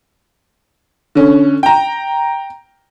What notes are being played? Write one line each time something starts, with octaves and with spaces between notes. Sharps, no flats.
D3 C#4
G5 A#5